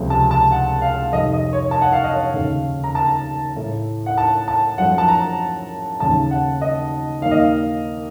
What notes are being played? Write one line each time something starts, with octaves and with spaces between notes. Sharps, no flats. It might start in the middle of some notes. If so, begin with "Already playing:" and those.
Already playing: C#2 C3 F3 A3
A5
A5
F#5
F5
F2 C3 D#3 D#5
D#5
C#5
A5
F#5
F5
D#5
C#5
D#2 C#3 A3 F5
A#5
A5
A2 A3
F#5
A5
A5
F#2 F3 A3 F#5
A5
A#5
D#2 C#3 A3 A5
F#5
D#5
D#2 D#3 A#3 F5
D#5
F5